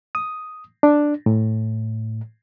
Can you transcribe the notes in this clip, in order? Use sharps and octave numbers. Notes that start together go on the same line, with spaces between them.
D#6
D4
A2